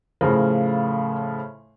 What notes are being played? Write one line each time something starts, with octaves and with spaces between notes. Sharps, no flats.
A2 C#3 F3 A#4